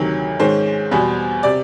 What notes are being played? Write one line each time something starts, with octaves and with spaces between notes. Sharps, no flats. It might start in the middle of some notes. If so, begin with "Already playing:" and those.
Already playing: D2 C3 D#3 F#3
G#2 D#3 G#3 C#4 C5
E2 B2 G3 B3
C3 D5